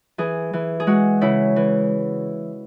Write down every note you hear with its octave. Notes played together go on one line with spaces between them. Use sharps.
E3 G#4
E3
G#4
G#3 F#4
C#3 E4
E3